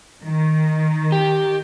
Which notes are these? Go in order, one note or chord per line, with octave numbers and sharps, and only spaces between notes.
D#3
G4